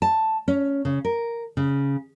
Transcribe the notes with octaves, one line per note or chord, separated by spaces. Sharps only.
A5
C#4
C#3
A#4
C#3